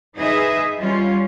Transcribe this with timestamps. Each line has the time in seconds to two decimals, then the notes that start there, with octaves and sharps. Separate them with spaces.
0.16 D#4 G#4 B4 D#5 E5
0.78 G3 C#4 F4